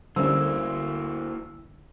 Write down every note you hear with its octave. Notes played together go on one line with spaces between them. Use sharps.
D2 D3 G3 A#3 C#4 E4 E6